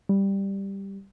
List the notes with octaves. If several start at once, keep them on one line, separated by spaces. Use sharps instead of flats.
G3